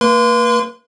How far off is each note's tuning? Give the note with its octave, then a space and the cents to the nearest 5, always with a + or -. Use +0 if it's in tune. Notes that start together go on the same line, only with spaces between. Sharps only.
A#3 -30 B4 -35 C6 -30